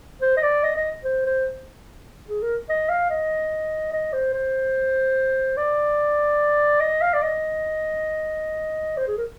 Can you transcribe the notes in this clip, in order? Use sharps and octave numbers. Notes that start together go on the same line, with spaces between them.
C5
D#5
D5
D#5
D#5
C5
C5
G#4
A#4
D#5
F5
D#5
D#5
C5
C5
D5
D#5
F5
D5
D#5
C5
G#4
A#4